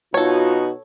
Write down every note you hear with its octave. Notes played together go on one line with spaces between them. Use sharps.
B2 D#4 F4 F#4 A4 C#5